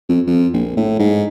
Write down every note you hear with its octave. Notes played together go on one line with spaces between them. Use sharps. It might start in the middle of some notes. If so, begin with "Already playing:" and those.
F2
F2
A#1
A2
G#2